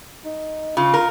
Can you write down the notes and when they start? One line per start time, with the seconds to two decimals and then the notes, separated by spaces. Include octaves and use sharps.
0.25 D#4
0.77 C#3 F4
0.94 A#4